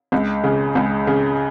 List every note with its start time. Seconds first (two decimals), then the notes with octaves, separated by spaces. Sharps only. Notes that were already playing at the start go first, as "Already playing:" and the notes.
0.12 C#2
0.44 C#3
0.75 C#2
1.07 C#3